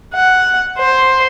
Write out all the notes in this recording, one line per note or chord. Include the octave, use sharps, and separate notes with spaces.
F#5
C5